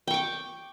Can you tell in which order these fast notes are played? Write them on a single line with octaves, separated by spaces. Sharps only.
G5 C#6 D6